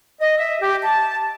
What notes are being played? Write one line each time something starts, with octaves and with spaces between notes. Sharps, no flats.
D#5
E5
G4
A5